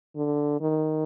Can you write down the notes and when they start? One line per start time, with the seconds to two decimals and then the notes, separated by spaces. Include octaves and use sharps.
0.16 D3
0.61 D#3